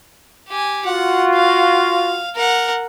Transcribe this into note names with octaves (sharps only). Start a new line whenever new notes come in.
G4 G#5
F4 F#4 F#5
F5
A#4 F#5